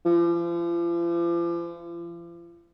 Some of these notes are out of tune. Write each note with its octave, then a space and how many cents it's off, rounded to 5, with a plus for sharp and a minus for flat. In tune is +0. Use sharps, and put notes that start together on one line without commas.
F3 -40